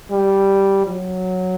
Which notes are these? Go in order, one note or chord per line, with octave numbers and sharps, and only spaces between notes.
G3
F#3